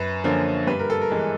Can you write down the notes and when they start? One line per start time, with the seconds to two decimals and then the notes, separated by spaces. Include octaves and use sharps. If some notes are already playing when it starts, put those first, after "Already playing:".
Already playing: F#2 B4
0.24 D3 F3 A#3 C#4
0.67 G2 B4
0.79 A#4
0.90 A4
1.01 A#4
1.11 E3 G#3